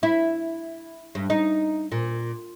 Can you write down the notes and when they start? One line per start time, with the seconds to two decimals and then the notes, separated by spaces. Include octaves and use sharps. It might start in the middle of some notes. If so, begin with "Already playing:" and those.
0.03 E4
1.15 G2
1.30 D#4
1.92 A#2